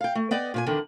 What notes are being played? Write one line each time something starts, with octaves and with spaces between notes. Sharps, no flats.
F5 G5
A3
B3 D5 D#5 G5
A#2 C#5 G#5
E2 D3 D#3